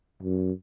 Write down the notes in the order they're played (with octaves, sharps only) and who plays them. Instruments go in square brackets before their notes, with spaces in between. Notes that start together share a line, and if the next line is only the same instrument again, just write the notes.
[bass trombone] F#2